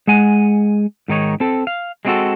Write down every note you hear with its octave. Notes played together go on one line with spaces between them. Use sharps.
G#3 F#5 G#5
G#2 D#3 D#4 C#5
C4 A4
F5
G#3 A#3 C4 D#4 F#4 A4